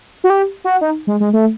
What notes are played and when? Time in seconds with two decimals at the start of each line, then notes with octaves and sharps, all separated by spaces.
0.24 F#4
0.30 G4
0.64 F#4
0.81 D#4
1.07 G#3
1.20 G#3
1.33 A3